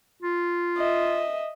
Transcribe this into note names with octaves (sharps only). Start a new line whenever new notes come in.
F4
D#5 E5